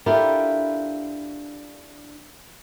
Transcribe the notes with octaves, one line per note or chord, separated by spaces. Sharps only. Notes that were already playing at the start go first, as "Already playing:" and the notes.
D4 E4 F4 G4 A4 A#4